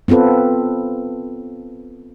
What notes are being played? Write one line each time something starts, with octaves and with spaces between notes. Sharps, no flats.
B3 C4 F4 A4 B4